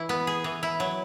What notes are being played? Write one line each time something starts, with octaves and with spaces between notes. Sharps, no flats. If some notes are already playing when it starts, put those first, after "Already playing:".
Already playing: E3 E4
B3
G#4
E3
E4
F#3